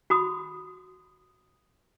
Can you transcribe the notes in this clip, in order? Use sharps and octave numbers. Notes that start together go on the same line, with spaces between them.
F#4 B5 D#6